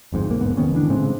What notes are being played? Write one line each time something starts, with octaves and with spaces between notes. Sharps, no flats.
G1 F2 G#2
B1 A#3
E1 G#2 B3
F1 D#3 B3 C#4
D3 E3 D4
A2 C#3 G#3 C4